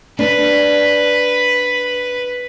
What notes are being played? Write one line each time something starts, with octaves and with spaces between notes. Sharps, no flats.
D4 B4